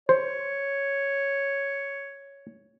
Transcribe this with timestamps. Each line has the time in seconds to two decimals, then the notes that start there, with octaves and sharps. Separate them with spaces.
0.09 C5 C#5